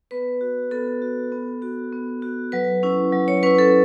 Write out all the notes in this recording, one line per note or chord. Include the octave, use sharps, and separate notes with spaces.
B3 B4
F#4
B3 A4
F#4
B3
F#4
B3
F#4
F#3 B4
C#4 E4
F#3
C#5
C#4 E4 B4
A4